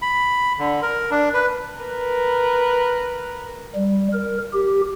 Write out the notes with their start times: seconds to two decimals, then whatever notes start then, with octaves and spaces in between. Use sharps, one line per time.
0.02 B5
0.59 D3
0.82 A#4
1.11 D4
1.34 B4
1.79 A#4 B4
3.75 G3
4.13 A#4
4.53 G4